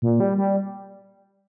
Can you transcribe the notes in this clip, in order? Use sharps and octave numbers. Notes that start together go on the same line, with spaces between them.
A#2
G3
G3